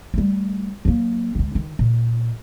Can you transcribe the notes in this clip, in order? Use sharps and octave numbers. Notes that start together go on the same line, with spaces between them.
G3 A3
F#3 A#3
D2 G#3
D#3
A#2